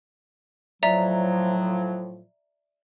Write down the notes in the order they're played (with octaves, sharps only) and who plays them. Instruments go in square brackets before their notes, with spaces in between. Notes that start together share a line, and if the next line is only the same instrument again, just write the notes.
[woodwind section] A2 F3 F#3 [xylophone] D5 E5 A#5